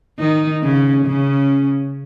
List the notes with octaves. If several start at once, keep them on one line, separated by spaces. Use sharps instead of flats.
D#3 D#4
C#3 C#4
C#3 C#4